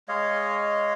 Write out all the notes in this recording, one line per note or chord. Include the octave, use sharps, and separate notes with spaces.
G#3 C#5 D#5 F5